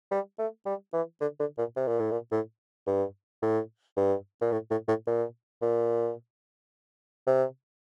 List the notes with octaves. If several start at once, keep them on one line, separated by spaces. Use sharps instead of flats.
G3
A3
G3
E3
D3
D3
A#2
C3
A#2
A2
A#2
A2
G2
A2
G2
A#2
A2
A2
A2
A#2
A#2
C3